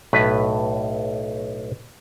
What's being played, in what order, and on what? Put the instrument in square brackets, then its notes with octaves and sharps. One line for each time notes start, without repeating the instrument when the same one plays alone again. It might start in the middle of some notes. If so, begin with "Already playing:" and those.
[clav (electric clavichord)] B1 A2 B4